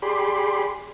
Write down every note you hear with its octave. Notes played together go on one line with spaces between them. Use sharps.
G4 G#4 D5 B5 C6